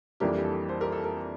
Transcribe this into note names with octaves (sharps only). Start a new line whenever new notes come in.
F2 E3 G3 A#3 D4 G4 A#4
G4
A4
A4 C5
G4 A#4
A4
G4 A#4